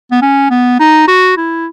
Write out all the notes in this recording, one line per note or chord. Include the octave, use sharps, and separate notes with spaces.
B3
C#4
B3
D#4
F#4
E4